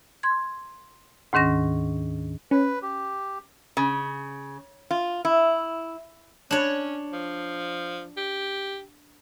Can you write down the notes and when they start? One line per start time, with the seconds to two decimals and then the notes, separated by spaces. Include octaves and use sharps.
0.23 C6 G#6
1.33 D2 G#2 D#3 C#4 A#6
2.51 C#4 B4
2.82 G4
3.77 C#3
4.91 F4
5.25 E4
6.51 C#4 D4 C#5
7.13 F3
8.17 G4